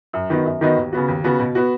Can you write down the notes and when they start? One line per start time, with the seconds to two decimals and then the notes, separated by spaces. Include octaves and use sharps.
0.13 F#2
0.30 D#3 B3 D#4 F#4
0.46 F#2
0.61 D#3 B3 D#4 F#4
0.77 D#2
0.92 C#3 B3 F#4
1.08 D#2
1.24 C#3 B3 F#4
1.39 B2
1.55 B3 F#4